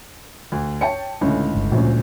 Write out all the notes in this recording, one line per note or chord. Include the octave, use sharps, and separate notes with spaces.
D2
C#5 G5 A5 C#7
C#2 A2 D3 A3 C#4
G1
D2 A#2 F3 C#4